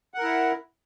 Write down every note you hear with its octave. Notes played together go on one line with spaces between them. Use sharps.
E4 A#4 F#5